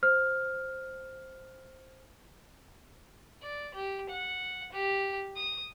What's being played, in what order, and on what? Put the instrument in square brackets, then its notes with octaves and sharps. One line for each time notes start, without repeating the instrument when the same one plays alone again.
[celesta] C5 F6
[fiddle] D5
G4
F#5
G4
D#6